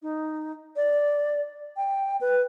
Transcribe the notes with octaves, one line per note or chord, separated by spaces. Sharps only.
D#4
D5
G5
B4